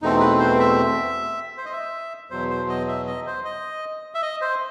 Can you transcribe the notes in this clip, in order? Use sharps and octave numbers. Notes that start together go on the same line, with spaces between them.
E2 B2 A3 C4 D#4
B4
C5
E5
C5
D#5
E5
E2 B2 F#3 C5
C5
D#5
E5
D#5
C5
D#5
E5
D#5
C5